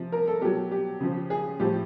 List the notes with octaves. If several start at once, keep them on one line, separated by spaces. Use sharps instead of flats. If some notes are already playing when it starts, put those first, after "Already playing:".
Already playing: C3 F3
A#4
A4
B2 F#3 G4
G4
C#3 F3
G#4
A2 F3 G4